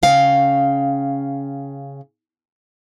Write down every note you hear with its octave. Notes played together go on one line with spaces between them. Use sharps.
C#3 F5 G5